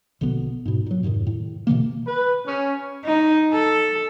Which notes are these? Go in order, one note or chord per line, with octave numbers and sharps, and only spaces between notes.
A#1 B2 D3 B3
G#2 B2
A#2 F#3
F2 G#2 C3 D#3
A2
B2 D3 E3 A#3
B4
C#4
D#4
A4